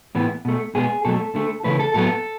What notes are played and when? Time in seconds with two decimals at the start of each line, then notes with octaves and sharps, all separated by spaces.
0.15 A2 E3 B3
0.45 B2 A3
0.75 B2 G#3 B3 G#4
1.05 B2 F#3 A3 A4
1.35 D3 A3
1.64 C#3 E3 A3 B4
1.79 A4
1.94 A2 F#3 B3 A4